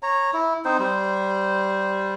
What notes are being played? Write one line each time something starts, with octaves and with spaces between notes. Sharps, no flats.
C#5 A#5
E4
C4 D#4 C5
G3 C5